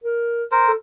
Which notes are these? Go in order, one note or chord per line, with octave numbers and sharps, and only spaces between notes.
A#4
A#4 C5
A4